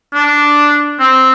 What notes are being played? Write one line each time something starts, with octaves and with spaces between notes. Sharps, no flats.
D4
C4